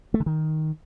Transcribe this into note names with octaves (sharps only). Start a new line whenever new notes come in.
A3
D3
D#3